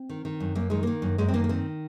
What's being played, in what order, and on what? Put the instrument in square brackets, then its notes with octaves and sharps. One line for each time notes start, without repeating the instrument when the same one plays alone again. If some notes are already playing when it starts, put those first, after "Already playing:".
Already playing: [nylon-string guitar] C4
D#3
D#3
F#2
F#2 A#3
D#3 G#3
D#3 A#3
F#2
F#2 G#3
C4
D#3 A#3
A#3
D#3 C4